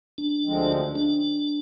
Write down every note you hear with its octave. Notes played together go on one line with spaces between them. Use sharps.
D4
D2 D3 F3 G#3 C4
D4